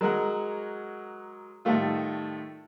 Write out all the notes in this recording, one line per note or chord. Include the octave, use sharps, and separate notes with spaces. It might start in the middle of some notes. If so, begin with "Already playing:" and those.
F#3 G#3 A#4 F#5
A2 D#3 G3 A3 F4